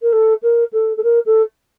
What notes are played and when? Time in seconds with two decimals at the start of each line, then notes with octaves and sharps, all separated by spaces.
0.02 A#4
0.12 A4
0.42 A#4
0.73 A4
0.97 A4
1.03 A#4
1.26 A4